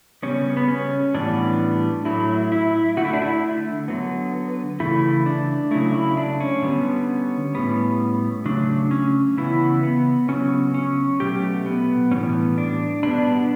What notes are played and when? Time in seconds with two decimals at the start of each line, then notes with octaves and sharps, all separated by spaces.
0.23 C#3 G3 B3 C#4
0.57 B3
0.68 C#4
1.14 A2 E3 G3 B3 D4
2.05 A2 F#3 A3 E4
2.52 E4
2.97 D3 A3 F#4
3.05 E4
3.13 D4
3.22 E4
3.88 D3 F#3 B3
4.80 C#3 E3 A3 E4
5.26 D4
5.71 C#3 F#3 A3 E4
5.95 E4
6.17 D4
6.40 C#4
6.62 D3 G3 B3
7.55 A2 G3 B3
8.45 C#3 F#3 A3 D4
8.91 C#4
9.37 C#3 E3 B3 E4
9.83 B3
10.28 C#3 F#3 B3 C#4
10.74 C#4
11.20 B2 F#3 A3 G4
11.66 B3
12.11 A2 E3 G3 B3 C#4
12.58 D4
13.03 B2 G3 B3 D4